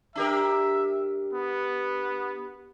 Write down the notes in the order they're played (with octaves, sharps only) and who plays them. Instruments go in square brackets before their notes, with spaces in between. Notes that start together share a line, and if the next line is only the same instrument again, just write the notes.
[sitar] D4 G4 A#4 [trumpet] E5
[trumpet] B3